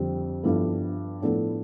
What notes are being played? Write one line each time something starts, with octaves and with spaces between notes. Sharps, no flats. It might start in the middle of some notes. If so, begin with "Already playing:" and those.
Already playing: F2 D3 G3 C4
G2 F3 B3 E4 A4
A2 F3 B3 D4 A4